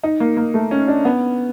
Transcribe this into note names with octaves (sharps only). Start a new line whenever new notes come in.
D#4
A#3
A#3
A3
C#4
D4
B3